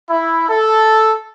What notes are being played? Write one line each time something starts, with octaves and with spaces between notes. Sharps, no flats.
E4
A4